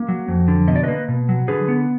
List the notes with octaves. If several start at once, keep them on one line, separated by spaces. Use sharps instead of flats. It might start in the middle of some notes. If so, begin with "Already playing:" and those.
Already playing: A#3
F#3
F2
D3
B2 D#5
D5
A#3 B4 D#5
B2
F#3
D3 G#4 B4
B3